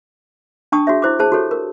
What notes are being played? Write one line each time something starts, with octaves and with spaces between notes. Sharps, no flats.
D4 G5 A5 C#6 D#6
F#4 G#4 C#5 E5
E4 C5 D6
G#4 C5 A5
F#4 G4 A4 C#5
A#4